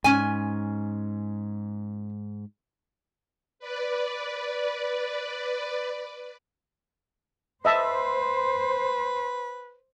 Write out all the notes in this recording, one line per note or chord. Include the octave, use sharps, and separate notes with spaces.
G#2 C#4 G#5
B4 D5
B4 C5 D#5 E5 A5